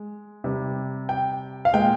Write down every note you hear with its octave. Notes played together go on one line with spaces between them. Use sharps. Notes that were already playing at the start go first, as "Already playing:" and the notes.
Already playing: G#3
C3 G3
G5
F5
A#2 G#3 G5